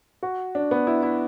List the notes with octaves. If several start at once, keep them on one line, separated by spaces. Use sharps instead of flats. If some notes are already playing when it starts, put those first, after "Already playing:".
F#4
D4
B3
E4
E4